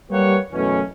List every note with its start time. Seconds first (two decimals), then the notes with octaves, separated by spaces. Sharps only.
0.11 G3 A#3 G4 B4 C#5 F#5
0.53 F#2 B2 E3 A3 C#4